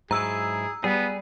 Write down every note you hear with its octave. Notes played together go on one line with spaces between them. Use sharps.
G#2 F#3 E4 G#4 A#5 E6
G3 B3 G#4